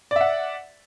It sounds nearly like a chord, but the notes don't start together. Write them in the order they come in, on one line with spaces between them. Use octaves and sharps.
D5 E5 F#5